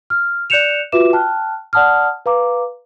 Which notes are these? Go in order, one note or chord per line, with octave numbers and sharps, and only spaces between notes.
F6
D5 F#6 G6 C#7 E7 F7
F4 F#4 B4 E5 D6 E7
G5 A5 F6 F#6
D5 F#5 A5 D#6 F6
B4 F5 A#5 D6